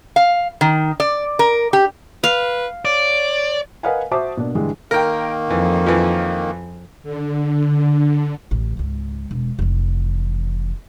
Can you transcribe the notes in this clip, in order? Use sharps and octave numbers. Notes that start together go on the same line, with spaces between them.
F5
D#3
D5
A#4
G4
B4 F5
C#5 D5
A#4 B4 D#5 F5 F#5 G#5
F#4 C5 E5 A5 D6 D#6
B2 A#3 D4
G2 D3 E3 G#3
D#3 A#3 A#4 G5
F2 E3
E3 F3
D3
A1 D2
G#1 C#2
E1
F1 E3